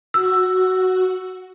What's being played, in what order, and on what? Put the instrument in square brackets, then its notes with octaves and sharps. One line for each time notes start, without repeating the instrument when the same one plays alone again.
[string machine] F#4 [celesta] E6